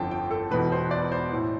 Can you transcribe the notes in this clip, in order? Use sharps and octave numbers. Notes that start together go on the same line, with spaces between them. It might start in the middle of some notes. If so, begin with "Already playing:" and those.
Already playing: G1 F2 D3 G5 A5
G5
A4
E1 E2 B2 B4
C5
D5
C5
A2 E3